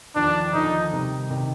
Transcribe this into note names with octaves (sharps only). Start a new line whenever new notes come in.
D#2 D3 F3 D4
D#2 D3 F3 D#4
C3 D#3 G3
C3 D#3 G3